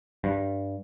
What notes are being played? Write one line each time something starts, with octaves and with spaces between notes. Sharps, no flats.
G2